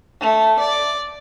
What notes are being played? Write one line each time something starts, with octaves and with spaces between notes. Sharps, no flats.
A3
D5